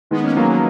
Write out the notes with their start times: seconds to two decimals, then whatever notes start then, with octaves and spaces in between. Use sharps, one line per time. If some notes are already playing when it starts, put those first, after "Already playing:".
0.11 D#3 G#3 B3
0.23 A#3 C#4
0.37 F#3 A#3
0.49 F3 G#3